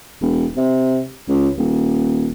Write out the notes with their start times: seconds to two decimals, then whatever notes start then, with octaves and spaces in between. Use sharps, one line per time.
0.21 E1
0.57 C3
1.29 C#2
1.58 D#1